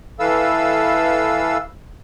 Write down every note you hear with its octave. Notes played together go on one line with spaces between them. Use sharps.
E3 A4 B4 F5 E6